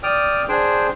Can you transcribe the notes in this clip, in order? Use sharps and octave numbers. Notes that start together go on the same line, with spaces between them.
D5 G5 D#6 F6
D4 G#4 C5 G5